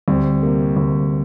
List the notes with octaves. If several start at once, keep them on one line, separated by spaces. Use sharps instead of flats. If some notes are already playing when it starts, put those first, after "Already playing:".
D2 G3 C4
C3 A#3
D2